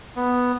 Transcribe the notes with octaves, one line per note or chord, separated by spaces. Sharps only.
B3